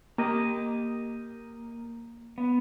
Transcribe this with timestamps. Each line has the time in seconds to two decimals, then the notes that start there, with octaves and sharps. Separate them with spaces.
0.18 A#3 G4 D#5
2.38 B3